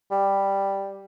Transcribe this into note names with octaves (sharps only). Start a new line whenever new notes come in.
G3